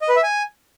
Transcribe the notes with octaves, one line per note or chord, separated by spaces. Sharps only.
D#5
B4
E5
G#5